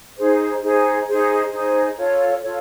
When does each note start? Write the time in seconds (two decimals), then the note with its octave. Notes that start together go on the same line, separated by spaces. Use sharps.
0.17 D#4 G#4 C5
0.62 D#4 G#4 C5
1.08 D#4 G#4 C5
1.52 D#4 G#4 C5
1.97 F4 A4 C#5
2.42 F4 A4 C#5